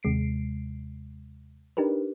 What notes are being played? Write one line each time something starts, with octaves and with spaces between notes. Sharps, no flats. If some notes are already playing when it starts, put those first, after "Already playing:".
D#2 C3 G#3 C7 D7
D4 D#4 G4 A#4 B4